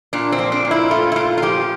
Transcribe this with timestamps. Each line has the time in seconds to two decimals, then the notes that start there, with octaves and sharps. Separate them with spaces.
0.13 A#2 D4
0.32 C4
0.39 F3
0.52 D4
0.65 A#2
0.71 E4
0.91 A3 F4
1.12 E4
1.16 A#2 F4
1.38 F4
1.42 F3 G4